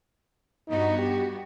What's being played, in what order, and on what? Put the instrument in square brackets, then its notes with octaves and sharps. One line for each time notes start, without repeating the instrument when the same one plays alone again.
[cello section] G2 B3 F#4 [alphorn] D#4
[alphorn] G4